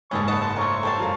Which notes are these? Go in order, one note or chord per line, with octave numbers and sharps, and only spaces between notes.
F#1 G#2 C#4 G#4 A4 B5 C#6
D#5 F#5 A5
A5 C6
F3 A3 A#4 C#5
G4 A4 C5 A5
F#2 F5